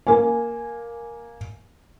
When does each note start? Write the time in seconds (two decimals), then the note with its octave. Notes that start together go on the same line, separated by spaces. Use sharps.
0.07 A#3 G#5